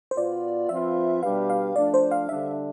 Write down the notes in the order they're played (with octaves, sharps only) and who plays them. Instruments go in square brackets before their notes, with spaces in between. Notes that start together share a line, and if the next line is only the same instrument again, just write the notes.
[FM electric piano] C5
[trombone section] B2 B3 F4 [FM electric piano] D5
[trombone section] F3 C4 F4 B4 [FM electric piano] E5
[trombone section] B2 G3 D4 G4 B4 [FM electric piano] F5
[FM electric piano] F5
[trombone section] F3 A3 D4 [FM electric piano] D5
[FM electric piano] C5
F5
[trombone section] D3 G3 D4 [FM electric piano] E5